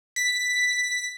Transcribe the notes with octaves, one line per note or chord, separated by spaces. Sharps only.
B6